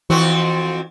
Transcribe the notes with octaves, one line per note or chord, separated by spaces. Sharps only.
F2 E3 C4 F#4